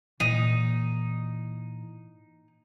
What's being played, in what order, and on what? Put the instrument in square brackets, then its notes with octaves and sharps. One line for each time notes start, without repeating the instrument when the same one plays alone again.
[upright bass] A#2 E3 [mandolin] D#4